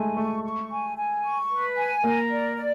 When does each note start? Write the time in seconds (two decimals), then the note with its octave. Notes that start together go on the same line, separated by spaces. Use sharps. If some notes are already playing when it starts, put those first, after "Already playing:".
Already playing: G#3 A3 G#5
0.17 A3 C#6
0.43 C#6
0.70 G#5
0.97 G#5
1.24 C#6
1.51 B4
1.77 G#5
2.03 A#3 A#4
2.30 D5
2.57 D5